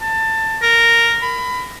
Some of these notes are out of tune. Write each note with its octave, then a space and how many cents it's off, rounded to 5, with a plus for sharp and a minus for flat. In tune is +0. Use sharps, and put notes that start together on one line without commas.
A5 +20
A#4 -5
B5 +20